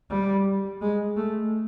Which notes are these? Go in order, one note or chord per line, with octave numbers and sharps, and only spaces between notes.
G3
G#3
A3